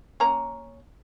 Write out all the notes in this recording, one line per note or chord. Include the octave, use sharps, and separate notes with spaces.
A#3 C#4 A#5